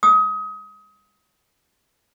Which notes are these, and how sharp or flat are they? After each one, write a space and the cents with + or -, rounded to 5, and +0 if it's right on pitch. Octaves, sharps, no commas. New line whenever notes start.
D#6 +25